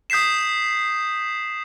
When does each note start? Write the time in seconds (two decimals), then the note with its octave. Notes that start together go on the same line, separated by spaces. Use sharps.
0.10 D#6 G6 B6 C7 E7